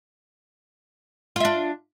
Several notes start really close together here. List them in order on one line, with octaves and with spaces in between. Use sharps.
F4 E5 D4